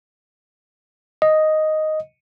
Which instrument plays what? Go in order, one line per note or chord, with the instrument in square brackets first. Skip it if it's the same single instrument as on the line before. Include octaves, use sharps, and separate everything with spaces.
[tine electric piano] D#5